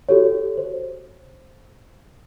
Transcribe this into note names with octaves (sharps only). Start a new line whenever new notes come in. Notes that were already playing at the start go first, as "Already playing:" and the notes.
F#4 G4 A4 C#5
C5